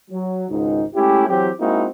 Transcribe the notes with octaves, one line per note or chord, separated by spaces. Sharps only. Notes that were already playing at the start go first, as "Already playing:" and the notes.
F#3
G#1 C#2 G#2 D#4
G#3 A3 C#4 E4 G4
E3 F#3 C4 G4
G#3 A#3 C4 D#4 E4 F#4